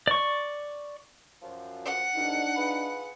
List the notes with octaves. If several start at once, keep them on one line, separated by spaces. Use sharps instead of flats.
D5 C#6
F#2 F3
F#5
C2 B2 D3 D4 D#4
F4 G#4 B4